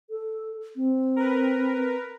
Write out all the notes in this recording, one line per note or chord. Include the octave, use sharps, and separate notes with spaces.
A4
C4
A#4 B4